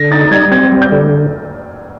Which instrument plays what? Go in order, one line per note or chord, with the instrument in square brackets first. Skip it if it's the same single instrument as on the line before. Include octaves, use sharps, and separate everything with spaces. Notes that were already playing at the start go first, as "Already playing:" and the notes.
Already playing: [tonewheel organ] D3 [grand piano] A#6
[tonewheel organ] D#4 [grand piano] A6
[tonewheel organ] G3 [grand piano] G#6
[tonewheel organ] C4 [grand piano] G#6
[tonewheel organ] G3
[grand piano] G6
[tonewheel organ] D3